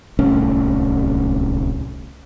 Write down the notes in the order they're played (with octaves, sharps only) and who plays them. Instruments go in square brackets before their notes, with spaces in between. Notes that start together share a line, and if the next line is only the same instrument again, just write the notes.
[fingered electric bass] D1 C2 A3 C#4